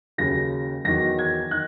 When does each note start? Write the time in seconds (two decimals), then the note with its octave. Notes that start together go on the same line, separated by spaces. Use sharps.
0.18 D#2 C#3 F#3 A#6
0.84 E2 D#3 F#3 A#6
1.19 G#6
1.51 D#3 F#6